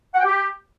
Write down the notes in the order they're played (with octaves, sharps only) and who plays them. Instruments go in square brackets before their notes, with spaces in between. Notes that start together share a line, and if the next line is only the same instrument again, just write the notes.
[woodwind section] F#5
G5
G4